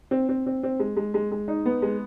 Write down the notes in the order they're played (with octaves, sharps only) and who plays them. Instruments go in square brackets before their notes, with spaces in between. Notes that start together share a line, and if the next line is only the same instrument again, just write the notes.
[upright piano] C4
C4
C4
C4
G#3
G#3
G#3
G#3
D#4
B3
G#3